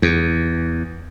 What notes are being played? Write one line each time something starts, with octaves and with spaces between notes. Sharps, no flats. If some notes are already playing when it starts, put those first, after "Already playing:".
E2